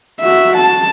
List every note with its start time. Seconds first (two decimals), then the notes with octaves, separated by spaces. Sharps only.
0.20 F#4 E5
0.57 A5